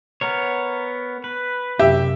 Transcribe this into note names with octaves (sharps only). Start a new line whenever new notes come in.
B3 A#4 C#5
B4
F#2 C3 G4 E5